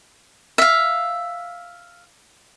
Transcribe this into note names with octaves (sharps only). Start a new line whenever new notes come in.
E5 F5